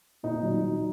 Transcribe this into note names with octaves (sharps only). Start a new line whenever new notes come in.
A#2 D#4
F#3
F#3